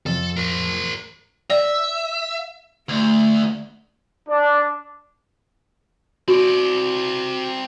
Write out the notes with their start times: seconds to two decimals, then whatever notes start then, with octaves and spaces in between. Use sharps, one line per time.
0.06 F2 A4
0.37 A#4 C5
1.50 D5 E5
2.89 D2 A3
4.29 D4
6.28 C4 F#4 D5